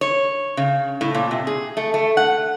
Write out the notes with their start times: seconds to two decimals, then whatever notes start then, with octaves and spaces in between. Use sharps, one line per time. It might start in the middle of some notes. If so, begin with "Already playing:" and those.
0.01 C#5
0.57 C#3
1.01 A2
1.14 A#2
1.31 C3
1.47 G#4
1.77 A3
1.94 A3
2.17 F#5